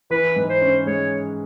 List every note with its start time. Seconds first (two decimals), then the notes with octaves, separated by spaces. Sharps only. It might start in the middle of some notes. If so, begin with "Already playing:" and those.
0.10 E3 B4
0.36 G#2
0.49 C5
0.62 C#4
0.86 G#3 C#5